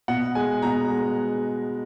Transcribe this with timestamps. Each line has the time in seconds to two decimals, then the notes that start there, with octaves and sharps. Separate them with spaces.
0.08 B2 F#5
0.35 G#3 G#5
0.62 B2 A#5
0.90 G#3